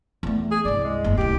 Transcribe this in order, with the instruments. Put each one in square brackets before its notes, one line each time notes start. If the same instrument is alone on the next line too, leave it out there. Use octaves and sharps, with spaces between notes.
[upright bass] E2 A3
[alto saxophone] G#4
[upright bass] C2 G2 [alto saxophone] D5
[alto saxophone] G#3
[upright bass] F#1 E2
[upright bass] D1 C2 [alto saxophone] G4